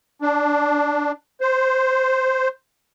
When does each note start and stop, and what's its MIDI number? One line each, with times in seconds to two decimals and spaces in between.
0.22 1.12 62
1.41 2.48 72